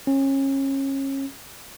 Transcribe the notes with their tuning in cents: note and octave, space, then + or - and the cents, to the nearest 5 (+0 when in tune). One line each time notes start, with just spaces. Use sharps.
C#4 -30